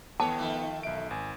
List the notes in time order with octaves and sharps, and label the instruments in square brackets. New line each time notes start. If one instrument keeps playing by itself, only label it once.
[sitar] D#2 A4 C#5 [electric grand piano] B3 [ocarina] G5 [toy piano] A5
[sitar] D#3 F3 A3
[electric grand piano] B1 D7 [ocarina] E5
[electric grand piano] G#1 [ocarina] G#5